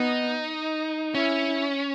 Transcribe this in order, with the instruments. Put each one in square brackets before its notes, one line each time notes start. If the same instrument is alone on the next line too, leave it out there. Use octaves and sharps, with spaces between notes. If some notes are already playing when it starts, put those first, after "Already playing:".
Already playing: [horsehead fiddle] B3 [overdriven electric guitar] D#4
[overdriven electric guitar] C#4 [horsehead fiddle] E4